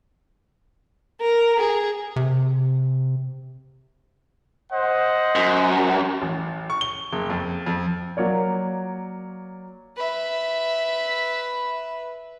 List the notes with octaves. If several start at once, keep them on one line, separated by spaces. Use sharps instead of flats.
A#4
G#4
C3
C5 D#5 F#5
F#2
A1
C#6
G7
F#1
F2
F2
F#3 A#3 C#5 D5
B4 E5